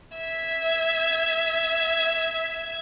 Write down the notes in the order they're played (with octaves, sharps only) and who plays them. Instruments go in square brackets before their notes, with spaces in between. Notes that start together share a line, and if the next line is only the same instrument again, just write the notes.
[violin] E5 G#6